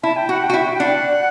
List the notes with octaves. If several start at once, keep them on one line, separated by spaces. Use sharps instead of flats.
E4 A5
G5
F#4 F#5
G5
F#4
E4
G5
D4 F#5